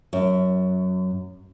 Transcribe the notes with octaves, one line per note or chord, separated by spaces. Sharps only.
F#2